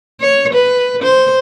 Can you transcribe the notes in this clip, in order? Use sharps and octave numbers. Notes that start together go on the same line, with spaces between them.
C#5
B4
C5